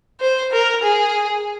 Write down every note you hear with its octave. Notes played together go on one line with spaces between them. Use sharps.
C5
A#4
G#4